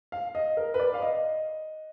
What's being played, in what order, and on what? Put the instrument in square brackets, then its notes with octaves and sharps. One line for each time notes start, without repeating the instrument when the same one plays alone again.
[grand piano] F5
D#5
A#4
B4
D5
F5
D#5